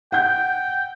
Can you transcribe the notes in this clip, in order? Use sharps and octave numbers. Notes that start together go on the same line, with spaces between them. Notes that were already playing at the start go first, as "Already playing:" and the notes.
F#5 G5 G6